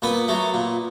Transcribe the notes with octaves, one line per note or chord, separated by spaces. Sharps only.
A#2 B3 B4
F#3 A3
A#2